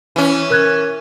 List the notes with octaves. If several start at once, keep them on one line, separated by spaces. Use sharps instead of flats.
E3 C#4
A#4 F#6 G#6